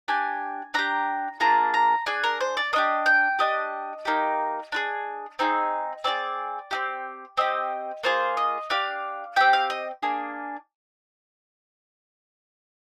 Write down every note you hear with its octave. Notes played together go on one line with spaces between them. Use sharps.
D4 G4 G#5
D4 G4 A#5
A#3 D4 F4 G#4 A#5
A#5
D4 G#4 G#5
A#4
C5
D5
A#3 D4 G4 D#5
G5
D4 G4 D#5
A#3 D#4 G4
D4 F4 G#4
C4 D#4 G#4
C4 F4 G#4 D5
C4 D#4 G4
C4 G4 D#5
A#3 F4 G#4 C5
D#5
D4 G4 F5
C4 G4 G5
F5
D#5
A#3 D4 G#4